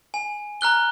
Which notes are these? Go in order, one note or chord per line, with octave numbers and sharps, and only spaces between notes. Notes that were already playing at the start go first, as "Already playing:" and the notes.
G#5
A#5 F6 F#6 G7